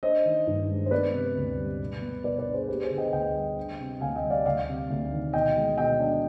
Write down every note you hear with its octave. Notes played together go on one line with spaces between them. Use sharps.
D4 C5 D#5
D#3
G2
G#3
C5
B3 B4 D5
C3
D2
G3
B2
B3
B2 B4 D5
B4 D5
D4
G#4 C5
B3 G4 B4
G#4 C5
D3
D#5 G5
D2 D#5 G5
G3
D4
C3
D2 F5 G#5
D#5 G5
G3
D5 F5
D2 D5 F5
C3
D2
D#3
B2 D#5 G5
G#3
B2 D#5 G5
D4